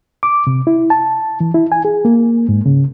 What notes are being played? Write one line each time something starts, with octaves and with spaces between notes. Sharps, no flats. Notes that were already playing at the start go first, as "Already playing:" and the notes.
D6
C3
E4
A5
E3
E4
G#5
G#4
A#3
G#2
C#3